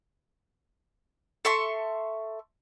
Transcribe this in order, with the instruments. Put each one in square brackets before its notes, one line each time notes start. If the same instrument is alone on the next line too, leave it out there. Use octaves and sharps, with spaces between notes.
[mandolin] A4 E5 C6 C#6